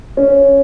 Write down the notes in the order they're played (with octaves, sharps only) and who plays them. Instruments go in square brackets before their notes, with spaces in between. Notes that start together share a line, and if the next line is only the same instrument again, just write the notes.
[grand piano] C#4